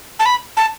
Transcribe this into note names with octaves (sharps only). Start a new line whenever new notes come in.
A5
B5
A5